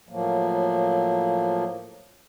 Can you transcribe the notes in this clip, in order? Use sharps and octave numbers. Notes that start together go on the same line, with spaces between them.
A2 F3 F#3 A#3